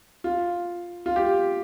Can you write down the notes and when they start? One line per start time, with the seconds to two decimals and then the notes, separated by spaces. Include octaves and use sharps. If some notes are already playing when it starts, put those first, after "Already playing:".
0.24 F4
1.06 F4
1.16 G4